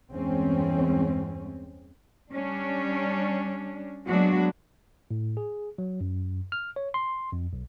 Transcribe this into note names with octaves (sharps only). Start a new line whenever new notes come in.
E2 G2 G#3 C4 C#4
G3 C#4 D4
F#3 G#3 A#3 B3 D4 F#4
A2
G#4
F#3
F#2
F6
C#5
C6
F2
B1